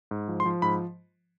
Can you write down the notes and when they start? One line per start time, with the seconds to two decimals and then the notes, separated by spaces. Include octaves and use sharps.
0.11 G#2
0.28 F3
0.40 C6
0.45 F3
0.62 G#2 B5